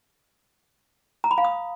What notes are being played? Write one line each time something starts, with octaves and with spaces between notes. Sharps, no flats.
A#5
B5
F5
D#6